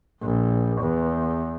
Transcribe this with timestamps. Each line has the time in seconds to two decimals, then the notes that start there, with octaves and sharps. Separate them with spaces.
0.23 A#1
0.81 E2